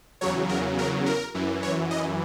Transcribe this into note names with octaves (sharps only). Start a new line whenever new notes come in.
E2 C#3 F#3 C#5
A#4
A#4
A#4
F#2 E3
C#5
D#5